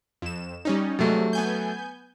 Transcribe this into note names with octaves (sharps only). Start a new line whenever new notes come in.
F2 E7
G3 C#4 D#4
G2 C3 F#3 G#3 A3
B3 G#5 G6